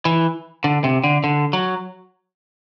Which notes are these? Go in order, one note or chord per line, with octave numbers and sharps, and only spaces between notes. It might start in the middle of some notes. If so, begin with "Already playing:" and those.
E3
D3
C3
D3
D3
F#3